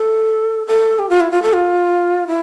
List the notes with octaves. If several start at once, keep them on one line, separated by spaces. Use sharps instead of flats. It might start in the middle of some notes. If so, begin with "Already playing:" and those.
Already playing: A4
A4
G4
F4
E4
F4
A4
F4
E4